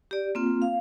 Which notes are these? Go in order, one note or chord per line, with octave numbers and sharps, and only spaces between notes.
G4 D5
A#3 C4 F4
F5